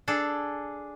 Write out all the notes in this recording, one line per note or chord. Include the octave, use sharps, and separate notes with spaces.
D4 G#4 A4